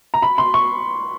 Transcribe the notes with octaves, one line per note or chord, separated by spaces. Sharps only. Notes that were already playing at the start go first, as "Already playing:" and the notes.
A#5
B5
C6
C#6